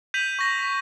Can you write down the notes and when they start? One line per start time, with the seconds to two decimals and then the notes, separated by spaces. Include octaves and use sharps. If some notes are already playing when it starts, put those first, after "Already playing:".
0.14 G6 B6 D#7 F7 F#7
0.39 C#6 A#6
0.59 B6